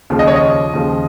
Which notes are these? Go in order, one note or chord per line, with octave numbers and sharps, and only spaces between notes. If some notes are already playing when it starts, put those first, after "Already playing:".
D#2 C#3 F3
D#5
C#5
D#5
D#2 C#3 F3